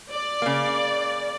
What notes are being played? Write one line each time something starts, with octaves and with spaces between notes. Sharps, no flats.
D5
C#3 A#3